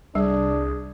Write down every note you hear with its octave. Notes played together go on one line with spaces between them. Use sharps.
C2 G3 D4 G#4